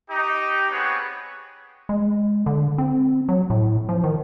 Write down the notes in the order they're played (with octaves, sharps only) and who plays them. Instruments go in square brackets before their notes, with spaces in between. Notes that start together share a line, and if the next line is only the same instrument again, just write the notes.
[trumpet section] D#4 G4
B3 C4 G#4 B4 C#5
[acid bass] G#3
D3
C4
F#3
A2
F3
D#3